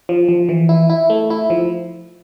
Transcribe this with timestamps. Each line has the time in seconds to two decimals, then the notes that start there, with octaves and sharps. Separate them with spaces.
0.09 F3
0.29 F3
0.49 E3
0.69 E4
0.90 E4
1.10 A3
1.30 E4
1.50 F3